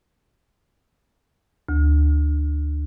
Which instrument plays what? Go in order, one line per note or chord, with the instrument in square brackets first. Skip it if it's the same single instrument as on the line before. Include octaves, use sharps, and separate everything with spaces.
[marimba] D2